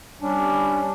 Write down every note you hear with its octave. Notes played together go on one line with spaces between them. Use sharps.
G3 C#4 D4